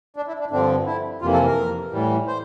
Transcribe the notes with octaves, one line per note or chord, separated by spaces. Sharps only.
D4
E4
D4
G2 D3 F3 C4 D4
E4
F2 C3 E3 A#3 F4
A4
A#4
A2 E3 G3
C5